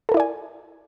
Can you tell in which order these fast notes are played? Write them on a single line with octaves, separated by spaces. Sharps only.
A4 A#4 E4 D5 G#5